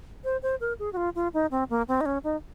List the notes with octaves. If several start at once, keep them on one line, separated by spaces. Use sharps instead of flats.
C5
C5
A#4
G#4
F#4
F4
F4
D#4
C4
A#3
C4
D#4
C#4
D#4